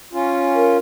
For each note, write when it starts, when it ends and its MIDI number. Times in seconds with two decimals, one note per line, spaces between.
0.13 0.77 61
0.13 0.77 65
0.55 0.79 70